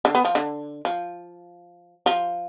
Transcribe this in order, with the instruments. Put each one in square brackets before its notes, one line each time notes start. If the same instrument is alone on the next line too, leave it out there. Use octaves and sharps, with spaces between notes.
[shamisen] D3
B3
F3
D3
F3
F3